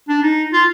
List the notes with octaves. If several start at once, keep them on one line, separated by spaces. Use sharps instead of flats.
D4
D#4
F4